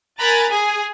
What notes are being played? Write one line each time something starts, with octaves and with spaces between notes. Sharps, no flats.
A#4 G#5 A#5 B5 F#6 A6
G#4 G#5